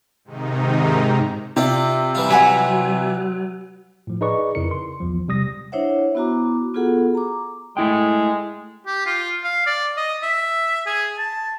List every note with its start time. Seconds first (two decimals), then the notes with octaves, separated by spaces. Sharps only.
0.24 G#2 C3 D#3 D#4
1.56 C3 F4 D5
2.15 E3 G3 F4
2.30 F#3 F#5 G#5 B5
4.07 A2 F3
4.21 D#4 G#4 B4 D5 D#5 C#6
4.55 F2 C#3 E4 A#4 C#7
4.71 C6
5.00 B1 E2 F3
5.28 C3 G3 D#6 A#6
5.72 D4 E4 C5 C#5 E5 F#5
6.15 B3 E4 F#4 A#5 D6
6.74 B3 F4 F#4 G#4 A4 F#5
7.15 A#5 D6
7.77 G#3 A3 E4 G5
8.87 G4
9.06 F4
9.44 F5
9.66 D5
9.97 D#5
10.23 E5
10.86 G#4
11.18 A5